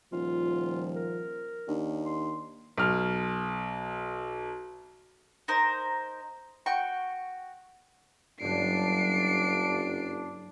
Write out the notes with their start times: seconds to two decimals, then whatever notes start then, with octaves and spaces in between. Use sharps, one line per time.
0.13 D#1 F3 F4
0.96 A#4
1.68 D#2 D4
2.06 C6
2.78 B1 F6
5.48 D#4 A#4 C5
6.66 F#4 G5 C#6
8.41 F#1 G2 F#3 D4 C7 D7